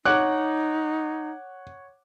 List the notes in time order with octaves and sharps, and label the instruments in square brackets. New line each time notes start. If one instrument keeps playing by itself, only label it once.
[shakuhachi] D#4 [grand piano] C#5 F#5 D6 [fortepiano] F#6